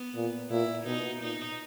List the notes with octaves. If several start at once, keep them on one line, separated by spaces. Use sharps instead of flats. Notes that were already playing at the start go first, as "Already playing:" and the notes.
Already playing: B3
A#2
A#2 E4
B2 D#4
A#2 D#4